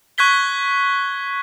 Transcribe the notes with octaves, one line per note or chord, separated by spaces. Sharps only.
C#6 F#6 G#6 B6 G7